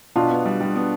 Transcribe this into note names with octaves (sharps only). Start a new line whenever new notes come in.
B2 D4 F4
B3
G3
G3
B3